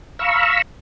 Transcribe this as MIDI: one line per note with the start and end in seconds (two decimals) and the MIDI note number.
0.19 0.62 77
0.19 0.62 82
0.19 0.62 83
0.19 0.62 85
0.19 0.62 88